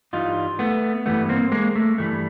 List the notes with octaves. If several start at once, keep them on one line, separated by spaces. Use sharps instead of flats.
G2 E3 G3 D#4 F4
A3 B3
G2 E3 G3 A3 B3
A#3 C4
G#3 A#3
A3
G2 E3 G3 A3